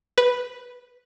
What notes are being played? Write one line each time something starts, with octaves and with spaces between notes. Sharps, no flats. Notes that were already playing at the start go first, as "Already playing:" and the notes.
B4